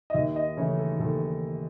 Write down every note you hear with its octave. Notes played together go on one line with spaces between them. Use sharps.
D#5
D#2 E5
D#5
C#3 E3 A3 C#5
A4
D#2 A4